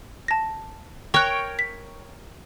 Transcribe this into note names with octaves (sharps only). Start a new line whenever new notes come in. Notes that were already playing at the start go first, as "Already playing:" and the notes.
A5 A#6
A#4 C#5 G5 C#6 F#6
B6